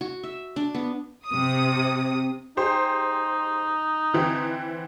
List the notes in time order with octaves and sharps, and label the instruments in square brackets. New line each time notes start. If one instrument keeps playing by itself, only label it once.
[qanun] F#4
E5
D4
B3
[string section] C3 D#6
[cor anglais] D#4 [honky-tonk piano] G4 G#4 C5
[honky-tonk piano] D3 E3 C4